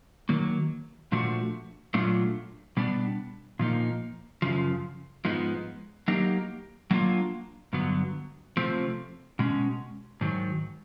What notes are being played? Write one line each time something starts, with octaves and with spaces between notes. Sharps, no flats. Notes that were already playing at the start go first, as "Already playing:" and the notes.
D#3 F#3 A#3
A#2 F3 A3 D4 F#4
A#2 F#3 A3 D4 F4
B2 G3 B3 D4
A#2 F3 A#3 D#4
F#2 C#3 F3
G#2 F3 G#3 B3 D#4
F#3 A#3 D#4 G4
F#3 A#3 D4 F4
G2 D3 F#3 B3
C3 F3 A3 C4
B2 G#3 C#4
G#2 D#3 F#3